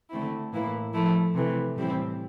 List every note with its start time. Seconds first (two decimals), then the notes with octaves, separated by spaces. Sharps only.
0.10 D3 A3 C4 E4
0.52 A2 E3 A#3 E4
0.93 F3 A3 E4
1.35 C3 E3 A3
1.76 A2 E3 G3 C4 E4